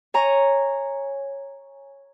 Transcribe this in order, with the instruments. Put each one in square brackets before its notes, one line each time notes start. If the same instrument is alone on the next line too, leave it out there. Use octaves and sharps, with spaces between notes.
[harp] C#5 G#5 A#5